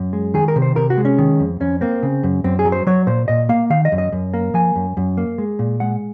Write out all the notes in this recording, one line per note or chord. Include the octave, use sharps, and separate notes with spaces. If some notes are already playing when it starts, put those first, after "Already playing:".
Already playing: F#2
G#3
D#3 G#4
A#4
C3
C5
C3 A#4
F#4
G#3
C#4
D#3
F2
F2 C#4
A#3 C4
C#3
F#2
F#2 C4
G#4
F#3
C5
F#3 C#5
A#2 C5
A#2 D#5
A#3 F5
D#3 F5
D#5
F#2
D#5
F#2
A#3
F3 G#5
F#2
F#2
A#3
G#3
A#2
G#3 F#5